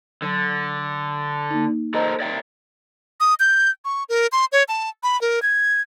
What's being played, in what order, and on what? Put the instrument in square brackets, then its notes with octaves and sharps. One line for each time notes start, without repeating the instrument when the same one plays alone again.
[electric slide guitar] D3 [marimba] F#3
[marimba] A#3 D#4
[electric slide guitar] A4 A#4 C5 [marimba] D#5
[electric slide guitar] D5 E5 G5
[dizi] D#6
G6
C#6
A#4
C6
C#5
A5
B5
A#4
G#6